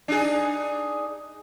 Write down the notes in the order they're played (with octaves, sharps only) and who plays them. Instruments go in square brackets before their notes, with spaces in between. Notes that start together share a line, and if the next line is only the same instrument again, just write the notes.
[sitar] D4 D#4 G#4